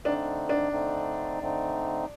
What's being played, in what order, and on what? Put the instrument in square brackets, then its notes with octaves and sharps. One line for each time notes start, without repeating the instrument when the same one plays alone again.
[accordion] D3 A3 C4 D#4 [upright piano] D4
[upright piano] D4
[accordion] D3 A3 C4 D#4
D3 A3 C4 D#4